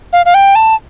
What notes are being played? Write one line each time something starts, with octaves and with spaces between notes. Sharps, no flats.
F5
F5
G5
A5